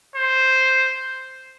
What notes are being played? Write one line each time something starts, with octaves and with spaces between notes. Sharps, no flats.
C5